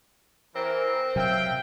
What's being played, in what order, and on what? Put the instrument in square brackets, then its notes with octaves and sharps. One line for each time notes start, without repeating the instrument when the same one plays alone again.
[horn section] E3 A#4 [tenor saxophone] C4
[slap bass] C3 F#3 [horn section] E5 F5 G5